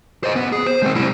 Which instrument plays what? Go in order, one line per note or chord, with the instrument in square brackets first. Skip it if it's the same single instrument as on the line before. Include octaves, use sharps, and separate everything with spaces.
[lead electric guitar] C5 D#5
B3
G#4
C5
G#3 C4
G3 E4